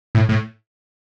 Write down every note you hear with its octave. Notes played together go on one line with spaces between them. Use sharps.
A2
A2